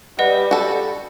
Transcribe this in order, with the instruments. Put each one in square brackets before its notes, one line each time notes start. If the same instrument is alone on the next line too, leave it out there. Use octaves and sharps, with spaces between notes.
[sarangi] G3 [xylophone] B4 D#5 F#5
[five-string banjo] F#4 A4